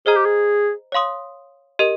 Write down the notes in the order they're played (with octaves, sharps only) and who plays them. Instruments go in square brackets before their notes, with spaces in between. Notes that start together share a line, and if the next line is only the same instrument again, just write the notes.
[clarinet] G#4 [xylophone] C5 D#5 A#5 F6
[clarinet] G4
G#4
[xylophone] C#5 F5 C6 D#6
G4 A#4 D#5